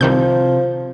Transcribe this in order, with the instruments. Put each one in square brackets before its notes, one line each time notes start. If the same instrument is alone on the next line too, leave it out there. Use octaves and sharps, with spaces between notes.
[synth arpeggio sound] C2 D#3 G6 [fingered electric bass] C3 [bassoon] F3